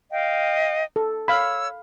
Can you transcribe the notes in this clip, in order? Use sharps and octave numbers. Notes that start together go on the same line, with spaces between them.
D#5 F5 G5
A4
C#5 F5 B5 E6